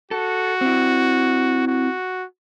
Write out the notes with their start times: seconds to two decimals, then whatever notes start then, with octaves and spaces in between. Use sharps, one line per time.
0.11 F#4 A4
0.61 C4 E4
1.67 F#4